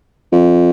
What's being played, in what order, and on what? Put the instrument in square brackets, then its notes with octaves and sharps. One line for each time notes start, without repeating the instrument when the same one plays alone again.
[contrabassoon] F2